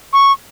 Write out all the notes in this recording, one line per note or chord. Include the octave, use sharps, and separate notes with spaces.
C#6